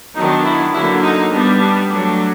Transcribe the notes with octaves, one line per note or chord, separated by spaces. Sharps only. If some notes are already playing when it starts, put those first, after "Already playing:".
D#3 F#3 B3 D4 D#4
E4
D3 F#3 A#3 E4
D#4
G3 B3 D4
D4
F#3 A3 D4